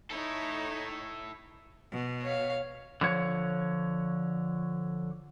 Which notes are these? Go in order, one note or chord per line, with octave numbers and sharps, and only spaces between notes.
D#4 E4 A4 C#5
B2
C#5 F5
D3 F3 C#5